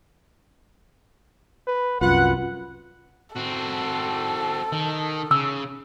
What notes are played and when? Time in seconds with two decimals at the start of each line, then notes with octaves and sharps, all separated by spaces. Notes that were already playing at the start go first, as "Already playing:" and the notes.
1.67 B4
2.01 C2 F#2 F4 B4 F#5
3.36 C4 F#4 A4
4.72 D#3
5.31 C#3 E6